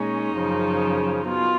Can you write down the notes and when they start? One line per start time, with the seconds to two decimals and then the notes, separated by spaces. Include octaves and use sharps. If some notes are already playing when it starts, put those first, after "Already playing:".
Already playing: A#2 G#3 C#4 D#4
0.37 F#2 C#3 F3
1.28 B2 F4